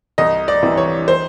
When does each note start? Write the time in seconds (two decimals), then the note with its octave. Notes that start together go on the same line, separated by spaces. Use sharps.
0.18 C2 D#5
0.48 D5
0.63 C3 E3
0.77 C#5
1.08 C5